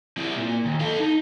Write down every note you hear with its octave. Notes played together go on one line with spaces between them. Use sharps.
C4 E4
A#2
D#2
A4 F5
D#4